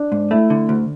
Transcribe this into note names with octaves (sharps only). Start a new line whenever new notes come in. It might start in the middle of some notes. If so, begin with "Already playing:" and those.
Already playing: D4
G#2
A3 E4
D3
D2